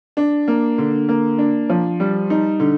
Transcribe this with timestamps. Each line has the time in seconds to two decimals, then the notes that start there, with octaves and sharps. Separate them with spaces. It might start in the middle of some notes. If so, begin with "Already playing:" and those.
0.17 D4
0.48 A#3
0.78 D3
1.09 A#3
1.38 D4
1.69 F3
2.00 G3
2.30 D#4
2.60 D3